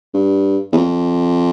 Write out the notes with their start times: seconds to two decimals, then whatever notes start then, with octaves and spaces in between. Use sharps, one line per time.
0.14 G2
0.73 E2
0.77 F2